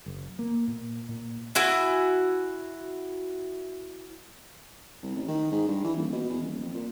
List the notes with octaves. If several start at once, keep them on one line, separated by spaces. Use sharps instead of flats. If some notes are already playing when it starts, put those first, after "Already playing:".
F#1
A#3
A#2
A#2
E4 F#4 G#5
C2
A1
D#3
G#2
G2
E3
D#1
B2
E2
D#1
F2
A#2